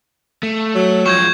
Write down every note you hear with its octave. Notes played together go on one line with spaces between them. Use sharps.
A3
F#3
F3 G#3 C#6 G6 G#6